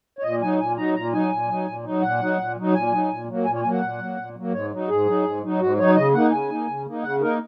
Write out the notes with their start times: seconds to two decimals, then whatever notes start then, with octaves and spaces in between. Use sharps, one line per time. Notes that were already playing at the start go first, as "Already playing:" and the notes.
0.19 C#5
0.23 A#2 D#5
0.41 F#3 D#4 G#5
0.59 A#2 G#5
0.77 F#3 D#4 A#5
0.95 A#2 A#5
1.13 F#3 D#4 G#5
1.31 A#2
1.48 F#3 D#4
1.67 A#2
1.84 F#3 D#4
2.02 A#2 F#5
2.20 F#3 D#4
2.39 A#2
2.57 F#3 D#4
2.74 A#2 G#5
2.92 F#3 D#4
3.10 A#2
3.28 F#3 A#3
3.45 A#2 G#5
3.55 C#5
3.63 F#3 A#3 G#5
3.73 F#5
3.82 A#2
3.99 F#3 A#3
4.17 A#2
4.35 F#3 A#3
4.53 G#2 C#5
4.71 F#3 D#4
4.88 G#2 G#4
5.06 F#3 D#4
5.24 G#2
5.43 F#3 D#4
5.60 G#2 F#4
5.78 F#3 D#4 C#5
5.96 C#3 D#5
6.14 A#3 D#4 F#5
6.32 C#3 G#5
6.49 A#3 D#4
6.68 C#3
6.85 A#3 D#4
7.03 C#3 F#5
7.21 A#3 D#4 A#4